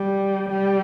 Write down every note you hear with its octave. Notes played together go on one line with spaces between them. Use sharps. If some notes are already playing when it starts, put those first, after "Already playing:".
Already playing: G3
G3